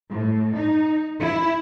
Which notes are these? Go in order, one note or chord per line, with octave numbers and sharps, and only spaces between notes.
A2
D#4
E4